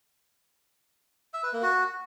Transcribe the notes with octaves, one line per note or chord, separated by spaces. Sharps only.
E5
B4
A#3
F#4